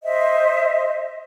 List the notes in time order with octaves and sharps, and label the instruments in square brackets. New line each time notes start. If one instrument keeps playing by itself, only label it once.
[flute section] C5 D#5 E5